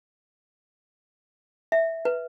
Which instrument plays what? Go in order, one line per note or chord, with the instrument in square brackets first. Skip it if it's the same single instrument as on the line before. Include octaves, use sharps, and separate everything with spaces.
[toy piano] E5
B4